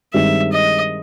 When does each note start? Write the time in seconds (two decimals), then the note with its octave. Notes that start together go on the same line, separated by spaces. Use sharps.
0.14 G2 D#3 G#3 C4 D#4 E5
0.53 D#5